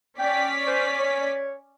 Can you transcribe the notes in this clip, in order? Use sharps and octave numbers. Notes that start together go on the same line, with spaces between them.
C#4 D5 G5 B6
C5
C#5